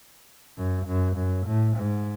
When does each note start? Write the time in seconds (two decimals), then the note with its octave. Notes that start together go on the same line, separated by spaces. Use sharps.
0.57 F#2
0.87 F#2
1.17 F#2
1.46 A2
1.77 G#2